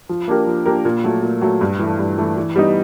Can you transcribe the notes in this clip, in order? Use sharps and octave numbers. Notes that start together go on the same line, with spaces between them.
F3
A#3 D4 G4 A#4
F3
A#3 D4 G4 A#4
A#2
F#3 A3
A#2
F#3 A3
G2
E3 A3
G2
E3 A3
E3
G3 B3 D#4